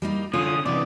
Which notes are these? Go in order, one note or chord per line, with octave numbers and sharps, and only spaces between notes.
G3 A#3 D#4
D3 C#4 F4 D#6
C3 E3 B3 D5